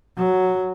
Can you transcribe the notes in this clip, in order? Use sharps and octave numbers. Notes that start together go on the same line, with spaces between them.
F#3